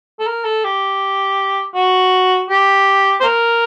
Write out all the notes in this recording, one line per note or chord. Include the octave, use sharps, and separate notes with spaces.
A4
A#4
A4
G4
F#4
G4
C5
A#4